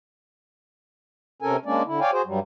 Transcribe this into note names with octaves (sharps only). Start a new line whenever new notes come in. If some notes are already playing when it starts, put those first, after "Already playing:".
C3 C#4 A4 A#4 G#5
G#3 A#3 C#4 D4 D5
D3 E4
C#5 D5 F5 G5 G#5
F#4 G#4 C5
G2 F#3 G3